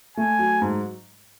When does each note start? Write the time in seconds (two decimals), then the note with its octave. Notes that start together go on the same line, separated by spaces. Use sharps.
0.17 A3 G#5
0.39 F#3
0.62 G#2